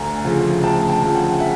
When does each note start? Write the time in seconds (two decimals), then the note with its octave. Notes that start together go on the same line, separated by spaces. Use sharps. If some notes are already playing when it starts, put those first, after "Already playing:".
Already playing: D2 G#5 A#5
0.24 C#3 F3
0.63 D2 G5 A5
0.89 G5 A5
1.02 C#3 F3
1.15 F#5 G#5
1.40 E5 F#5